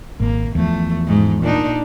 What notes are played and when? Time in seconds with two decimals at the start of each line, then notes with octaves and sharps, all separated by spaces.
0.20 G#1 A#3
0.55 E2 F3 A3
1.07 G#2
1.43 A#2 D4 D#4